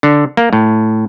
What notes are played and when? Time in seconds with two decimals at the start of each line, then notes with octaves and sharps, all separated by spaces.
0.03 D3
0.37 A#3
0.53 A2